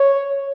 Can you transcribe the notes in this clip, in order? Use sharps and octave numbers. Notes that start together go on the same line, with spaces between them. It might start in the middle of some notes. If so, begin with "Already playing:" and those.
Already playing: C#5